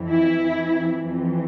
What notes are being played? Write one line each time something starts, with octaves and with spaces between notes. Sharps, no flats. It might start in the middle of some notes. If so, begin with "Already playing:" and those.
Already playing: F2 E3
E4
F2 E3
F2 E3